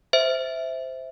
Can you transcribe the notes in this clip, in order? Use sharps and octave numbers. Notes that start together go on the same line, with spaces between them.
C5 E5